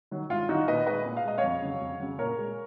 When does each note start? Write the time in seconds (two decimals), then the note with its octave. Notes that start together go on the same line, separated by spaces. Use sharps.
0.11 D#3 F#3
0.30 G#2 F4
0.49 D#3 F#3 D#4 F#4
0.68 A#2 B4 D#5
0.86 G#3 B4 D#5
1.06 A#2
1.17 F5
1.25 G#3 D#5
1.38 C#5 F5
1.44 F2
1.62 C#3 F#3
1.81 F2
2.00 C#3 F#3
2.18 A#2 A#4 C#5
2.38 G#3